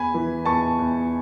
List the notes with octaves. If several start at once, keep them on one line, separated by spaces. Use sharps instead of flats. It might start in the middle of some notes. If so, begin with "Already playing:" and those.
Already playing: E2 G#5 B5
E3
E2 A5 C#6
E2